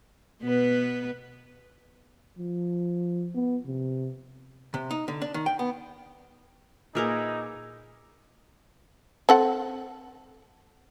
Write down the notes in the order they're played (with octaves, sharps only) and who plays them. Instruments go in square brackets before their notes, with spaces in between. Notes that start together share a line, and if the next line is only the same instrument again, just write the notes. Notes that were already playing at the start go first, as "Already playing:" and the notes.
[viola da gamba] B2 B3 B4
[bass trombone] F3
B3
C3
[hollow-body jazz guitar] C3
D#4
D3
D4
D#3
G5
B3
[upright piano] A#2 [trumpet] D#4 [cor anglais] E4 [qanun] G#4 A#4 B4
[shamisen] C4 A4 F#5